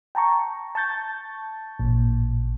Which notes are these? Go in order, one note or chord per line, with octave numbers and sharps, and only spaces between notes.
G5 A5 A#5 C#6
A5 C#6 G6 A6
A1 A#2